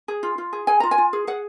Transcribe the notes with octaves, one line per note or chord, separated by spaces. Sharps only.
G#4
F4
F4
G#4
G#4 G#5
F4 A#5
G#5
F4
G#4
G#4 F#5